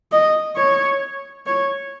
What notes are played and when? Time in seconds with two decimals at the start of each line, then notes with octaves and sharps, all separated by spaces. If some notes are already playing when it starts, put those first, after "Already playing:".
0.12 D#5
0.56 C#5
1.46 C#5